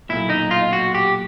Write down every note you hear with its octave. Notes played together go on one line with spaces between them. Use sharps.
B1 A#2 E4
D#4
F4
F#4
G4